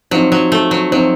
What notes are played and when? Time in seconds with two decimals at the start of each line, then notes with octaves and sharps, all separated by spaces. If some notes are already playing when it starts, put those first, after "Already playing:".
0.11 F3 F#3 C4 D#4
0.32 F#3
0.52 A3
0.71 F#3
0.91 F3 F#3 C4 D#4